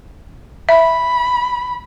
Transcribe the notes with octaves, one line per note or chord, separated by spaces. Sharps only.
E5 B5